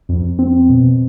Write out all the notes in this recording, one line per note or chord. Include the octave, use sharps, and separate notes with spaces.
F2
C4
B2